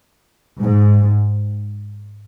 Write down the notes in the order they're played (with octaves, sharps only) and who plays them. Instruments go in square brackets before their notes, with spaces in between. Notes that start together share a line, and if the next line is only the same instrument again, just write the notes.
[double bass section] G#2